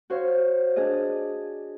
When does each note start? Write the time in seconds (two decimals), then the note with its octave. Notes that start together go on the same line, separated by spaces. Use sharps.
0.10 F#4 C5 C#5 F5
0.76 D4 G#4 D5 D#5